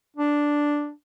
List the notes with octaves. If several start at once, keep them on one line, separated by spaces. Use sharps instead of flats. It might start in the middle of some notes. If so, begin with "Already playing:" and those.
D4